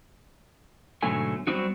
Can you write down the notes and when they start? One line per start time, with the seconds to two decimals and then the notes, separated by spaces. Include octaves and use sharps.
1.03 G#2 B2 D3 F#3 A3 G#5
1.47 F#3 G3 B3 C4 D#4 F#4